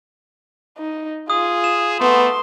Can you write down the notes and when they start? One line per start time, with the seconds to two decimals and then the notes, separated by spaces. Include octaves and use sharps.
0.78 D#4
1.30 F4 G#4 D#6
1.64 E7
2.00 A3 B3 C6